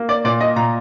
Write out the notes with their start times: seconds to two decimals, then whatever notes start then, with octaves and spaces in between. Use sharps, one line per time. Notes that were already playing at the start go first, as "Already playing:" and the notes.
Already playing: A#3
0.09 D5
0.24 A#2 D5
0.40 D#5
0.56 A#2 A#5